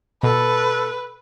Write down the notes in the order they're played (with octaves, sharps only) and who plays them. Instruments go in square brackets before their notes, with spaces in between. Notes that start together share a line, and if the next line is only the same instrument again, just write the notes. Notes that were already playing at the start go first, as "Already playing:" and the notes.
[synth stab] B2 [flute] A4 [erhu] B4